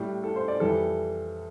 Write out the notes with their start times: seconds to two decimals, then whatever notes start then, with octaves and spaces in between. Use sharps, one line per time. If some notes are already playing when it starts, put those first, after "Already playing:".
Already playing: A2 G3
0.24 A4
0.36 C5
0.48 D5
0.60 F2 E3 G3 A4